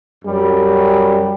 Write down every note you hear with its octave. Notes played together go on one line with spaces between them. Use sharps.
F#2 G3